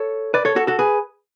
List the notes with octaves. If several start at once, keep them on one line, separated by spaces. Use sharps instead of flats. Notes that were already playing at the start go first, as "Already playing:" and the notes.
Already playing: A4 C#5
B4 D5
A4 C#5
F#4 A4
F#4 A4
G#4 B4